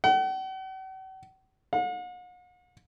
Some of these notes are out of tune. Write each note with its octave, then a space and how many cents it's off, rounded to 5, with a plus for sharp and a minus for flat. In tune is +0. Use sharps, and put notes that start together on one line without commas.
F#5 +45
F#5 -45